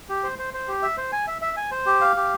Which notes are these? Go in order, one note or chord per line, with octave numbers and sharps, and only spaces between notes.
G4
C5
C5
C5
G4
E5
C5
G#5
E5
E5
G#5
C5
G4
F5
G4